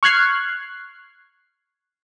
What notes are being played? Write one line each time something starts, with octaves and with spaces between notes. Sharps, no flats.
C#6 F6 F#6 G#6 C7